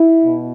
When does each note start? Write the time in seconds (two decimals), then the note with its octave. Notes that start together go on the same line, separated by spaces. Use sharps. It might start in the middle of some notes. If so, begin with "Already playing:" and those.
Already playing: E4
0.23 B2